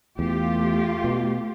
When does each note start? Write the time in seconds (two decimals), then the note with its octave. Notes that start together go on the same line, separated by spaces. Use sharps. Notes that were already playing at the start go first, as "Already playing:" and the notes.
0.19 E2 A3 F4 G4
1.04 B2